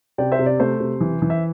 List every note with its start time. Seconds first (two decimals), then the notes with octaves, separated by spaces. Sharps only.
0.18 C3 D5 G5
0.32 C5 E5
0.39 C3
0.46 D5
0.60 A3 C5
0.80 C3
1.01 E3
1.22 E3
1.30 E5